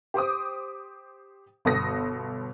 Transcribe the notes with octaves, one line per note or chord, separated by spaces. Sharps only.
G4 C5 D6 D#6
G1 B2 A4 D#6 A#6